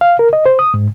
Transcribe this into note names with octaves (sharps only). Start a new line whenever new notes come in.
F5
A#4
D#5
C5
D#6
G#2